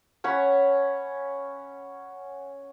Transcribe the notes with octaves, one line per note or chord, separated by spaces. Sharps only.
C#4 C#5 F#5 B5